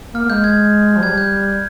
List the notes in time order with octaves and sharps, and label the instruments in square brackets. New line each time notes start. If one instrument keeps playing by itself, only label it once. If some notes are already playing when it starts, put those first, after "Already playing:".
[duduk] A#3 [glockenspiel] F6
[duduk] A#3
[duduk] G#3 [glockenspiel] G6
[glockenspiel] G#6
[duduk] F3
[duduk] G3 [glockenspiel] G#6
[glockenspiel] G6